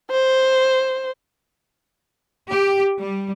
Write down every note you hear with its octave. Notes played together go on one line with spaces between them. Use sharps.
C5
G4
G3